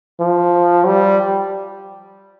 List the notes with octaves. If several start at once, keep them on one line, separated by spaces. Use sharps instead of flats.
F3
G3